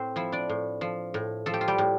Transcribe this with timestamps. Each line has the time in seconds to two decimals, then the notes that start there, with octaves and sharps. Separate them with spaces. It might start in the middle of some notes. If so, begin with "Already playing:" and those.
Already playing: A2 C4 C5
0.16 F3 E4 E5
0.32 D4 D5
0.49 A2
0.81 F3
1.14 A2
1.46 F3 A4
1.54 G4
1.61 F4
1.68 G3 G4
1.78 A2